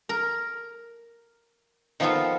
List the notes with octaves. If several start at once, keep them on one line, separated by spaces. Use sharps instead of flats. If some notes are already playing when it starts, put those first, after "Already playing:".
A#4
D#3 F3 B3 D#4 F4 A4